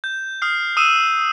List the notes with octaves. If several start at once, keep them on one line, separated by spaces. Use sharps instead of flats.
G6
D#6 F6 C7
D#6 E6 D#7 E7